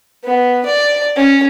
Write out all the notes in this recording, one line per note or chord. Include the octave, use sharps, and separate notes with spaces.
B3
D5
C#4